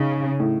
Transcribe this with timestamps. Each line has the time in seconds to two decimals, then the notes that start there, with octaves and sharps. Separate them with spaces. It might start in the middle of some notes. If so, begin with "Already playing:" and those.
Already playing: C#3 D#4
0.40 A2